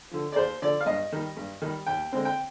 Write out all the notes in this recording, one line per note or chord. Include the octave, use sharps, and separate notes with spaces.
D3 F3
D5
D#2 C5
D3 F3 D5
F5
G2 D#5
D#3 G3
G2
D#3 G3
D#2 G5
D3 G#3 C4
G5